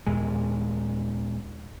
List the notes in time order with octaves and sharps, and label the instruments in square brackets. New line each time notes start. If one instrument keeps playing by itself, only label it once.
[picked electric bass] D#2 A#2 G#3